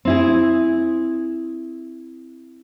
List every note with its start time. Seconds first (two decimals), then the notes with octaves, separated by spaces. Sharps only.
0.05 C4 E4 G#4